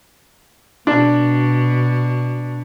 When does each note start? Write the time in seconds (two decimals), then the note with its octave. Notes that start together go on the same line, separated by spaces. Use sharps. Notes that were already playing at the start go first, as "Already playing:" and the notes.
0.87 B2 D4